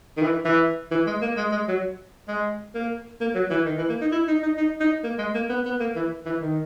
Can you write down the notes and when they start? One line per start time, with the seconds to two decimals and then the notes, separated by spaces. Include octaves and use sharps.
0.17 D#3
0.22 E3
0.45 E3
0.91 E3
1.06 G#3
1.22 A#3
1.37 G#3
1.52 G#3
1.68 F#3
2.28 G#3
2.75 A#3
3.21 A#3
3.35 F#3
3.50 E3
3.65 D#3
3.78 E3
3.89 A#3
4.01 D#4
4.12 E4
4.28 D#4
4.43 D#4
4.57 D#4
4.80 D#4
5.04 A#3
5.18 G#3
5.34 A#3
5.49 B3
5.65 B3
5.80 A#3
5.95 E3
6.26 E3
6.41 D#3